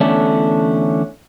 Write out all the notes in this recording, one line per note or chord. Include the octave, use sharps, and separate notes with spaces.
E2 D3 A3 C#4 D4